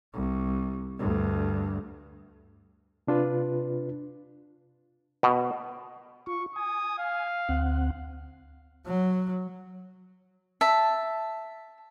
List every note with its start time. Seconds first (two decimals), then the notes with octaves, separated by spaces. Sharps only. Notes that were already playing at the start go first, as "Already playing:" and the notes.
0.14 C2
0.98 D2 G2
3.07 C3 D4 F4 B4
5.23 B2
6.27 F4 C#6
6.56 G#5 D#6
6.98 F5
7.49 D2 C4 F#5
8.86 F#3
10.61 E5 A5